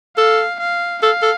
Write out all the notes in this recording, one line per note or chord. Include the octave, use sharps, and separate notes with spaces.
A4 F5
F5
A4 F5
A4